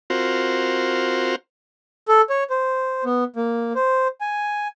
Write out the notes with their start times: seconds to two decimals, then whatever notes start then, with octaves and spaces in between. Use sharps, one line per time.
0.10 C4 F4 F#4 A#4 C5
2.08 A4
2.30 C#5
2.50 C5
3.05 B3
3.36 A#3
3.75 C5
4.21 G#5